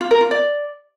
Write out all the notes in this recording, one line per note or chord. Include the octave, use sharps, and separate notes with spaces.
F4
A#4
F4
D5